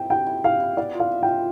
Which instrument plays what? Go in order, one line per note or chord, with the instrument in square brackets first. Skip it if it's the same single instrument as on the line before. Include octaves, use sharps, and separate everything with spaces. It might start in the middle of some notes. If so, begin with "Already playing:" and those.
Already playing: [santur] E4 C5 [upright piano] G5
[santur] G4 [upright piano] G5
[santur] E4
[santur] G4 [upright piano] F5
[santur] E4
[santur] B3 [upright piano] D5
[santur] F4
[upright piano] F5
[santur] E5
[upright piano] G5
[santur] F4